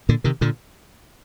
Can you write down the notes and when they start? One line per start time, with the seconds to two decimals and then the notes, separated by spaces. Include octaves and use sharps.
0.09 A#2 D3
0.24 C3 D#3
0.41 A#2 D3